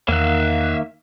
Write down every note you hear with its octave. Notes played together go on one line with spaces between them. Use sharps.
E2 D#3 A#3 E5 F5 F#6